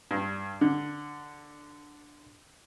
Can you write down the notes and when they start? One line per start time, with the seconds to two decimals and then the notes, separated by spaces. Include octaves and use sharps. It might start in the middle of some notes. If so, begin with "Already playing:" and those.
0.11 G2
0.61 D3